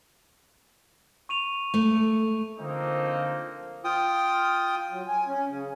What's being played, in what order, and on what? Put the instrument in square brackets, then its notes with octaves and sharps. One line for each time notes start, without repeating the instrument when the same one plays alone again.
[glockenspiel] C#6 D#7 F7
[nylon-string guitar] A3
[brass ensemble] D3 F3 A#3 C4 D#4
[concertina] F4 G5 D#6
[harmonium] F#3
G#5
C#4
C#3